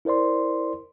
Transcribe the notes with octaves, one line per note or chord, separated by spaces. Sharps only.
E4 A#4 C5 D5 C6